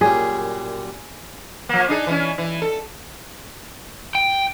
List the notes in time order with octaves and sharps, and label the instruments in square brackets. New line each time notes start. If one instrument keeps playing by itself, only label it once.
[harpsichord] F#2 A#2 G3 [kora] G#4
[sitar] F3 A#3
D4 D#4 G#4
E3 C#4
E3
A4
[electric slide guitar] G5